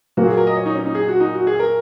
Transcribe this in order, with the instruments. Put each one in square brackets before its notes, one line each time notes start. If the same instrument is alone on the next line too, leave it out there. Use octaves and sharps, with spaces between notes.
[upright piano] A#2 F#3 A#3 [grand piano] F#4
[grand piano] G#4
A#4
D#5
C#5
D#4
C#4
D#4
G#4
F#4
D#4
F#4
G#4
A#4